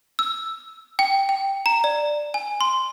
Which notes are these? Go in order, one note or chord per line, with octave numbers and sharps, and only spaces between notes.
E6
G5
G5
A#5
D5
G#5
C6